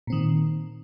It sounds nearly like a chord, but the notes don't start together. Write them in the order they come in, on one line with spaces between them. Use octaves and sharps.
A#2 C4 D#3